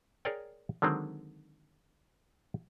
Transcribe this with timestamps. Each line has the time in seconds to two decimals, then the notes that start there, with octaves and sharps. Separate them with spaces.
0.25 G#4 A#4 C#5 D5 G5
0.82 D3 D#3 F#3 G#3 C4